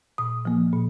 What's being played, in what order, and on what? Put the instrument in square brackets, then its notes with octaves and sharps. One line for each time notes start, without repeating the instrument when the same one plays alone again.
[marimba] A#2 D#6
F3 A#3
A#2